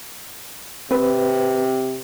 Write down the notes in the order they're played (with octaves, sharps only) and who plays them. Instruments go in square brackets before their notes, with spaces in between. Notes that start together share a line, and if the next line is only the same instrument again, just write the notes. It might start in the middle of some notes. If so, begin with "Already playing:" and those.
[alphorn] C3 [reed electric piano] C4 B4